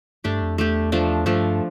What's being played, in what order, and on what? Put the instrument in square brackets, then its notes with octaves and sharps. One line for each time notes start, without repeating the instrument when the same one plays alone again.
[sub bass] G2 [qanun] A3 D4 G4
[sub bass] F2
[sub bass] E2 [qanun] A3 D4 G4
[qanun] F3 A3 D4
[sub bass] G2 [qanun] F3 A3 D4